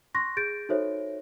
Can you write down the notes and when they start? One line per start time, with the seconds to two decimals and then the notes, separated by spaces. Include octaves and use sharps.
0.15 C6 C#6 F#6 A#6
0.37 G#4 G6 A6 D7
0.69 D#4 F#4 A4 C5 C#5 E5